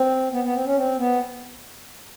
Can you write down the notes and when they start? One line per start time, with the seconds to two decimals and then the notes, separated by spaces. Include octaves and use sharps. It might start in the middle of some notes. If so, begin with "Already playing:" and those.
Already playing: C4
0.33 B3
0.44 B3
0.55 C4
0.66 C#4
0.77 C4
0.99 B3